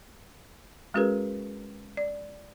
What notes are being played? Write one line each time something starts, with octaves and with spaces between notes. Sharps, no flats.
G#3 C#4 F#4 G#4 A#4 B4
D5